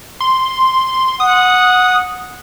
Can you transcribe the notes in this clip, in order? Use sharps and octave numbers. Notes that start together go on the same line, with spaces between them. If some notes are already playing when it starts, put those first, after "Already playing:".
C6
F#5 D#6